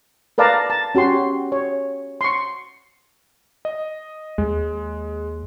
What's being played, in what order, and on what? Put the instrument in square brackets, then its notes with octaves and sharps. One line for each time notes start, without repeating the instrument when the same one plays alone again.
[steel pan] A#4 B4 D5 F5 A5 A#5
A5
C#4 F#4 G4 C6
C#5
C6 C#6
[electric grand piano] D#5
[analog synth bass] D#2 [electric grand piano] G#3